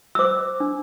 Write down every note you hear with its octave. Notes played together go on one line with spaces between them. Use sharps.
E6
C5 D6
D4